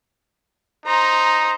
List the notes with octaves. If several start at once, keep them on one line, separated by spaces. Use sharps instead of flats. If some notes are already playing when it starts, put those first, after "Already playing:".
D#4 C5 A#5